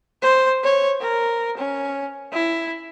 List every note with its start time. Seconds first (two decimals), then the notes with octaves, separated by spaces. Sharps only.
0.22 C5
0.63 C#5
1.01 A#4
1.57 C#4
2.33 E4